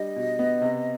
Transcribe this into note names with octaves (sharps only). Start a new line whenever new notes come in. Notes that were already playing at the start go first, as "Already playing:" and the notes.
Already playing: G3 D4 D#5
B2
B3
C3